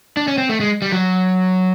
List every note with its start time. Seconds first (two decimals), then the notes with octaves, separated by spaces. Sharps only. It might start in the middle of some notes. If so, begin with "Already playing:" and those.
0.17 D4
0.28 C#4
0.38 C4
0.49 A3
0.60 G#3
0.82 G3
0.92 F#3